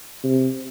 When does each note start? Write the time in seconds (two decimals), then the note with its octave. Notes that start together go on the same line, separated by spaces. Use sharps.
0.24 C3